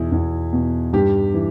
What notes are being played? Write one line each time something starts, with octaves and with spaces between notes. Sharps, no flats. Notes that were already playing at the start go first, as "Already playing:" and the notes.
Already playing: E2 B2 E4
E2
B2
G2 G4
E3